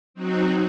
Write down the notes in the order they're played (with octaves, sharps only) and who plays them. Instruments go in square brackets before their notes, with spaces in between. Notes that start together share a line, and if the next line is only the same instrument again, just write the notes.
[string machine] F#3 C4 D#4 F#4